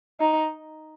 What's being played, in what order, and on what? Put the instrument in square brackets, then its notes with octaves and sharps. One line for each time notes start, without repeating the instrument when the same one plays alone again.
[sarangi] D#4